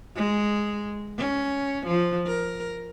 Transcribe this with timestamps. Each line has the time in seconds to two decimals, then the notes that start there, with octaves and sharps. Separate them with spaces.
0.15 G#3
1.18 C#4
1.87 F3
2.27 A#4